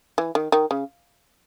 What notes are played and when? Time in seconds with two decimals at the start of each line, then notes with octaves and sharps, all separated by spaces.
0.18 E3
0.35 D#3
0.52 D#3
0.71 C#3